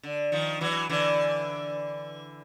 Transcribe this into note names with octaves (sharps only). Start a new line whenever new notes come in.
D3
D#3 F3
E3 F#3
D3 E3